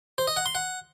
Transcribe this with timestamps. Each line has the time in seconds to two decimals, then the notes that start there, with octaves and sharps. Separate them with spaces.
0.18 C5
0.27 D#5
0.37 F#5
0.46 C6
0.55 F#5